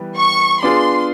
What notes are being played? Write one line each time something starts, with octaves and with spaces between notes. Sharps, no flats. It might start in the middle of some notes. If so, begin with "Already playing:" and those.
Already playing: E3 G3 B3
C#6
B3 D4 F4 G#4 C6